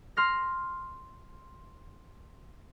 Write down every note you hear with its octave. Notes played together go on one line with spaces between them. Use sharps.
C6 F6 A#6